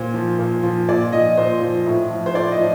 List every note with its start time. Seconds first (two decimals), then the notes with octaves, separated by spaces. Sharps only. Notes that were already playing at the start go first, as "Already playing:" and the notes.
Already playing: A#2 C5
0.14 F3
0.39 A#2
0.63 F3
0.88 A#2 D5
1.12 F3 D#5
1.37 A#2 C5
1.61 F3
1.86 A2
2.11 F3
2.26 C5
2.35 A2 D5
2.52 D#5
2.59 F3